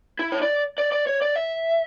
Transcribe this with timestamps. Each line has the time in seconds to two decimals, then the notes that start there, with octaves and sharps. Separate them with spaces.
0.19 E4
0.32 C#5
0.42 D5
0.78 D5
0.92 D5
1.07 C#5
1.22 D5
1.36 E5